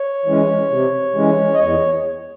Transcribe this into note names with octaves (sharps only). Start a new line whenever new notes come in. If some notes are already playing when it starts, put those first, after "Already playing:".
Already playing: C#5
E3 G#3 C#4
C3
E3 G#3 C#4
D#5
E2 C#5